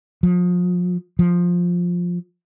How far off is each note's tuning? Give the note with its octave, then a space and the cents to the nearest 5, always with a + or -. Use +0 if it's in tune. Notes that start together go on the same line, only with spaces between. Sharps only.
F3 +35
F3 +10